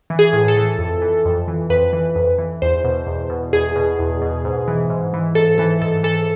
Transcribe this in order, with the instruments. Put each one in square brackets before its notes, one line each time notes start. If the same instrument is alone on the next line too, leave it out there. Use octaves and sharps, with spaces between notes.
[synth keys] E3
G#4
A2
A4
E3
F2
E3
F2
E3
F2 B4
E3
F2
E3
E2 C5
B2
E2
B2
E2 G#4
B2
E2
B2
G#2
E3
G#2
E3
G#2 A4
E3 A4
G#2 A4
E3 A4